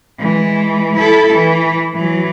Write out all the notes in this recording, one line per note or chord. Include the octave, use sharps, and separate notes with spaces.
E3 G#3
E4 A4
E3
E3 F#3